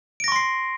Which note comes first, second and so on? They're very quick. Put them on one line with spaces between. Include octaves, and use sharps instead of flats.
D7 A#6 C#6 C6 C7